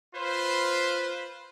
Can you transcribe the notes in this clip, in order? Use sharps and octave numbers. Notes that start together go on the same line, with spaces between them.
F4 B4 C5